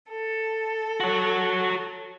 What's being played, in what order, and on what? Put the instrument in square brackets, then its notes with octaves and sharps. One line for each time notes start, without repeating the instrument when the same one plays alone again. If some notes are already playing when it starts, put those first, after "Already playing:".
[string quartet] A4
[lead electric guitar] F#4 C#5